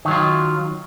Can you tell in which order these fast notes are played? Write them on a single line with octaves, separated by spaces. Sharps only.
D#3 F#3 F4